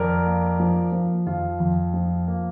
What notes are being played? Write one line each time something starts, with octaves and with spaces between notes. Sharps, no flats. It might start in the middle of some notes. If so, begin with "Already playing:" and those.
Already playing: F2 A#4 D5
A#3
F3
F3
F2 F4
F2
F3
A#3